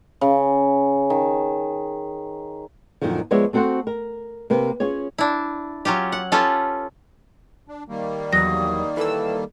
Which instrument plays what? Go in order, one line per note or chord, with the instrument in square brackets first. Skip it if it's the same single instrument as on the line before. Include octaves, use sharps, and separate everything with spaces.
[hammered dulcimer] C#3
D#3
[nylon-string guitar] F#2 A#2 D3 D#3 F3
F3 G#3 B3 C#5 D5 E5
A3 C4 F#4 A4 C5 F#5
A#4
C3 A#3 B4
C#4 F4 G#4 C#5
[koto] D4 E4
F#3 C#4 F4 G4
F#5
C#4 F4 G4 A4 B4
[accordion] D4
D#3 G3 A#3
[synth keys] E2 F#3 [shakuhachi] D#6 [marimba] A#6
[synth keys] E3 E6 [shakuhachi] A4